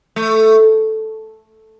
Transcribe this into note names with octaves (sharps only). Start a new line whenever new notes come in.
A3